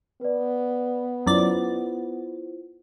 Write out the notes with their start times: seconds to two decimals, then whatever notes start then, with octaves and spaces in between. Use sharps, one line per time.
0.21 B3 B4 D5
1.26 F#2 E4 F4 C5 D5 A6